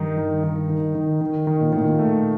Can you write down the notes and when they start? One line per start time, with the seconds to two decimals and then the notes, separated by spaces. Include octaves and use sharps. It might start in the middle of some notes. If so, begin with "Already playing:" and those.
Already playing: G2 D#3 D#4
0.18 D#3
0.44 D#3
0.70 D#3
0.95 D#3
1.21 D#3
1.47 D#3
1.60 A#2
1.72 A2 D#3
1.84 A#2
1.99 A3